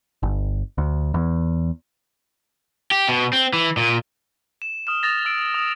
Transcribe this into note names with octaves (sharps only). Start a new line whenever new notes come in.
G1
D2
E2
G4
B2
C4
E3
A#2
E7
D#6 F6 E7
D#6 A6 A#6 F7
E6 D7
D#6